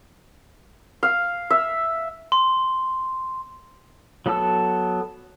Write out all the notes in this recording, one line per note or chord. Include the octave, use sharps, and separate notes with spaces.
F5
E5
C6
F#3 B3 A4 A5 E6